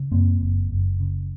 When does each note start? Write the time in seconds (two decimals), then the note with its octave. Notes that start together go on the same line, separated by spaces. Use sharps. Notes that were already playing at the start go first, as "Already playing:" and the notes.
Already playing: C#3
0.11 F#2 A#3 C4
0.41 F#1
0.70 F#1
1.00 C#3